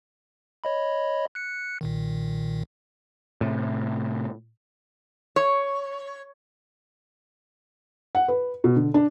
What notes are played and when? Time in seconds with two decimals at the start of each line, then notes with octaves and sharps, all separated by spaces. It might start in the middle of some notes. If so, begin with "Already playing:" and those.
0.64 C#5 D#5 B5
1.35 F#6 C#7
1.81 B1 A#2 D#3
3.41 A2 C3
5.36 C#5
8.15 F#5
8.28 B4
8.64 B2
8.76 D3
8.94 D4